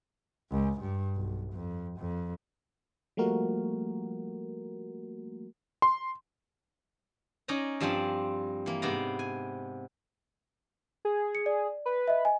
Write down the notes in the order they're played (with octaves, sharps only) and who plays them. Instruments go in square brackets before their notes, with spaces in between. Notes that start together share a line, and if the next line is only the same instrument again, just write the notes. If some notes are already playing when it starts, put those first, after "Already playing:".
[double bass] C#2
G2
B1
F2
F2
[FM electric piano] F3 G3 A3 A#3 F#4 A#4
[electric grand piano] C6
[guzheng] C#4 D#4 D5 D#5 A#5
G2 F3 G3 C4 D5 A5
E3 A#3
G#2 C3 B3 D5 F5 A#5
G#5
[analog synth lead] G#4
[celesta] C#7
D5
[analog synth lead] B4
[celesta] D#5 E5
D#5 G#5